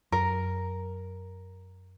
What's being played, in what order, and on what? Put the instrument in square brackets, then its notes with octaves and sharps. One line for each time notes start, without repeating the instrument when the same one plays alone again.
[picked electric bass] F#2 [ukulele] A#4